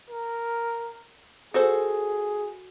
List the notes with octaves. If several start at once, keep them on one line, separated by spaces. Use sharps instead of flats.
A#4
F#4 G#4 A4 C5